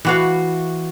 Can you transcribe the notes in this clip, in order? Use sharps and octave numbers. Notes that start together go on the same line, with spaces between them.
E3 F#4 F5